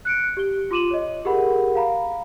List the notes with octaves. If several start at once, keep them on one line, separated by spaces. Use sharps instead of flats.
F#6 C#7 D7
G4 G7
F4 C6 D6 D#7 E7 F#7
C#5 D#5
G4 G#4 A#4 F#5 B5
F5 A#5 B5